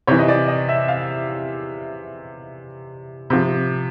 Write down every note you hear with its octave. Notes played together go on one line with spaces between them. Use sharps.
C3 E3 C#5
D#5
D5
D#5
E5
F5
C3 F3